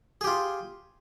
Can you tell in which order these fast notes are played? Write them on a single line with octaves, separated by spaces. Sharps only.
G#4 G4 F4